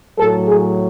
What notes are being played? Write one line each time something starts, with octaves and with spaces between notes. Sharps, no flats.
A2 F#3 A4
G#4